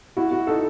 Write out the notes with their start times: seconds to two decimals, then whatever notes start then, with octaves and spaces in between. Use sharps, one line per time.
0.17 E4 F#4
0.31 F#4
0.47 D#4 A4